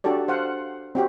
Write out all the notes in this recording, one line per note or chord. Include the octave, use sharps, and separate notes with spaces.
D4 F#4 G4 A4 D5
C5 F5 F#5
C4 F#4 G4